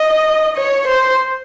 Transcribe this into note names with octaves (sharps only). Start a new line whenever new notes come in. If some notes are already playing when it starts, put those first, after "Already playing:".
Already playing: D#5
C#5
C5